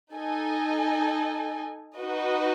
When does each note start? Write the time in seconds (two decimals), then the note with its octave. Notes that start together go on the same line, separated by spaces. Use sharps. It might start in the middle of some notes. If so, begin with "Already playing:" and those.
0.12 D#4 A4 D#5 G#5
1.97 D#4 F#4 B4 D#5